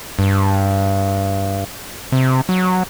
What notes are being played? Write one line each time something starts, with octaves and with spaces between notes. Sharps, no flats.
G2
C3
F#3